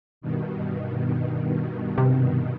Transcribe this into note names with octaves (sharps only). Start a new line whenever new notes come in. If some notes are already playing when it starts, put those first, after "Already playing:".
G2 B2 D#3
C3